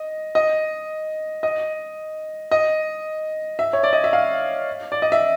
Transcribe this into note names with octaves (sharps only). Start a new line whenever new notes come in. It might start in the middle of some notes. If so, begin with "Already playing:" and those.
Already playing: D#5
D#5
D#5
D#5
E5
C#5
D5
D#5
E5
F5
D5
D#5
E5